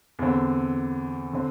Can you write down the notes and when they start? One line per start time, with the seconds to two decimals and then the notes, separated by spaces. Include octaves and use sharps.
0.19 E2 D3 C4
1.33 D3 C4